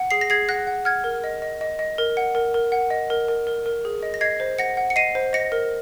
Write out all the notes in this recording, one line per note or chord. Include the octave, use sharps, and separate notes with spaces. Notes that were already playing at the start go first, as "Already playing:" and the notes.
Already playing: F#5
G#4 C7
A#6
G#4 G#6 C7
F#5 F#6 A#6
F#5
F#5 F6 G#6
A#4
D#5
D#5
D#5
D#5
A#4
F#5
A#4
A#4
F#5
D#5
A#4
A#4
A#4
A#4
G#4
D#5
A#6
D#5 G#6 C7
C5
F#5 A#6 C#7
F#5
C#7
D#5 C7 D#7
C5
D#5 A#6 C#7
A#4